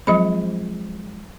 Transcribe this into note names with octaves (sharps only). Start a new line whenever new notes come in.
F3 F#3 G#3 C4 D#5 B5